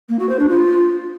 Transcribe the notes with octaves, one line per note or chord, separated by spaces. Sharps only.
A#3
F#4
C5
D4
F4